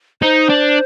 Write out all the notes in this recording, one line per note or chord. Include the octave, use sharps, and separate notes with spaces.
D#4 C5
D4